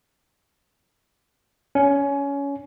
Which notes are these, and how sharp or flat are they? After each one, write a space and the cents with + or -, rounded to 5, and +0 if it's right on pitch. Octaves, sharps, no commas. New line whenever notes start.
C#4 +20